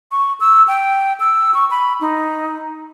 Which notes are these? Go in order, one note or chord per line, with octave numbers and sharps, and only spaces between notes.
C#6
E6
G5
E6
C#6
B5
D#4